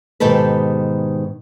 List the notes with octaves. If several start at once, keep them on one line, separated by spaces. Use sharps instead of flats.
G#2 B2 D#3 G4 A4 B4